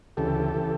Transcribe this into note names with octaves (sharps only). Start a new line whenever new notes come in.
D2 C#3 E3 G4 A4
C#3 E3